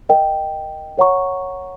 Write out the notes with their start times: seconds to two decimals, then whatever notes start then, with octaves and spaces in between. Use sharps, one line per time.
0.09 A#4 D#5 G5
0.98 A#4 C#5 F#5 A#5 C#6